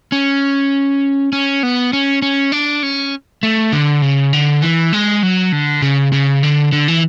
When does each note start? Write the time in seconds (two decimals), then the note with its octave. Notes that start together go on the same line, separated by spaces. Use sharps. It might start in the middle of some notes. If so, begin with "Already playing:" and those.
0.12 C#4
1.33 C#4
1.63 B3
1.93 C#4
2.22 C#4
2.52 D4
2.83 C#4
3.43 A3
3.72 D3
4.02 C#3
4.33 D3
4.62 E3
4.93 G#3
5.23 F#3
5.52 D3
5.82 C#3
6.13 C#3
6.43 D3
6.72 D3
6.88 E3